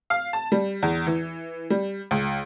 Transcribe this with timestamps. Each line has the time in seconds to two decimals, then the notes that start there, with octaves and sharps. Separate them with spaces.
0.10 F5
0.33 A5
0.52 G3
0.83 E2
1.07 E3
1.70 G3
2.11 C#2